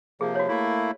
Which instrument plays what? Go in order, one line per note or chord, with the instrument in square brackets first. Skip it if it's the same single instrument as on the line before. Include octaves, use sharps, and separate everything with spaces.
[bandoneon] C3 F3 A#3 [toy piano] G#4
[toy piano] F#4 C#5
[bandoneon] A3 A#3 E4